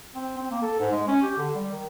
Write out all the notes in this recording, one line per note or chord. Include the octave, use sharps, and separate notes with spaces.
C4
C4
A#3
A4
G#2
G#3
C#4
G4
D3
G3
D#3